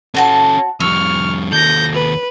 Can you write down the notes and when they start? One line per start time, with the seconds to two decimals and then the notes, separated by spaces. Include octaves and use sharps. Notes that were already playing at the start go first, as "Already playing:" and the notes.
0.15 C4 C#4 F#4 A4 A5
0.80 F2 G3 C#6 E6 F6
1.52 D#2 A4 G6 A#6
1.95 B4